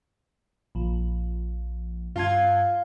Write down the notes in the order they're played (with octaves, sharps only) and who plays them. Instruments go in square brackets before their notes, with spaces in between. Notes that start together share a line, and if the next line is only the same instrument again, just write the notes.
[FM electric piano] A#1 F3
[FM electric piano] G2 A5 G#6 [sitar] F4